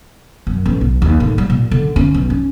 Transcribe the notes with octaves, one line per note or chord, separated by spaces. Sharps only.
F#2
A1
B1
D#2
A2
G3
A#2
D3
C#4
B1
C#4